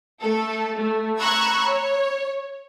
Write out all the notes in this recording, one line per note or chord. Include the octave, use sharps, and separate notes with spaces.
A3 A4
A3
A#5 B5 C#6 E6 F#6 G#6
C#5